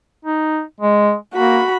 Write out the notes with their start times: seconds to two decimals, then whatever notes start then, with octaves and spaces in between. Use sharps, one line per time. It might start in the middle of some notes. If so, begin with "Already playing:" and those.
0.25 D#4
0.80 G#3
1.34 A#3 F#4 B5